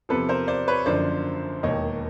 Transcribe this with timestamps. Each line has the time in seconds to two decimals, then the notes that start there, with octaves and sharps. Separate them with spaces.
0.09 E2 C3 F3 A4 B4
0.29 A#4 C5
0.48 C5 D5
0.68 B4 C#5
0.86 F#1 F#2 D3 F3 C5 D5
1.63 E1 D#2 D#3 C#5 D#5